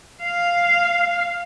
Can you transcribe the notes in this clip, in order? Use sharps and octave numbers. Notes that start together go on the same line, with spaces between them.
F5